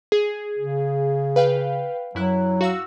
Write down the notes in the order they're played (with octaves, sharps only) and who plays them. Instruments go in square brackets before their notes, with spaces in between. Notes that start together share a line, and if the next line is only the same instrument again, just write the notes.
[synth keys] G#4
[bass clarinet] C#3
[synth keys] B4 F5 G5
[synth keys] F#2 E4 F#6 [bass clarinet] F#3
[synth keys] F#4 F5 E6